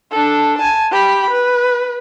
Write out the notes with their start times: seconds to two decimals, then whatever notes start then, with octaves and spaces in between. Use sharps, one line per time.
0.11 D4 A4
0.58 G#5 A5
0.91 G4 B5
1.30 B4